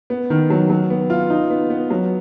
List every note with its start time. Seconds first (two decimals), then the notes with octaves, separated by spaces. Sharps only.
0.10 B3
0.30 D#3
0.50 F#3
0.70 F#3
0.90 B3
1.10 F4
1.30 D#4
1.50 B3
1.70 B3
1.90 F#3